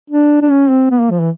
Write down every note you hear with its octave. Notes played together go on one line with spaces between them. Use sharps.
D4
D4
C#4
C4
B3
A#3
F3
E3